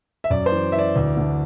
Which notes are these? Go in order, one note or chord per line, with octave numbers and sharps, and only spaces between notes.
E5
F#2 D5
C5
E3
E3 E5
D5
D2
D3